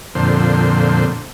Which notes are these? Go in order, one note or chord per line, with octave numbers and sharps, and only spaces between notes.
F2 A#2 D3 C5